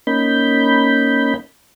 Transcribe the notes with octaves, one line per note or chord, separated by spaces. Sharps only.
A#3 C#4 D#4 B5 G6